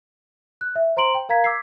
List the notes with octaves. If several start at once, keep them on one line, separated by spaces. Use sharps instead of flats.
F#6
E5
C5 A#5 C6 D7 F#7
G5
A#4 F5 A#5 G#6 B6
D6 E6 G#6 B6 C7